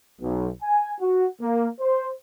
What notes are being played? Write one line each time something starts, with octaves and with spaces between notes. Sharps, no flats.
B1
G#5
F#4
A#3
C5